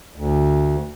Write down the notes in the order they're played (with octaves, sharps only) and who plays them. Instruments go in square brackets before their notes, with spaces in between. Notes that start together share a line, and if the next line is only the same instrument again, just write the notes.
[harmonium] D2